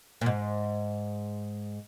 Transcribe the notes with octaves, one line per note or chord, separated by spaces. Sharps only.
A#2
G#2